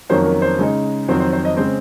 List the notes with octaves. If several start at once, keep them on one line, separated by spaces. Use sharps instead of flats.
F2 D#3 F#3 A#3 C#4 C5
A#4
C5
C#3 G#3 D#4
F2 D#3 F#3 C4 C5
C5
C5
D#5
C#3 G#3 C4 C5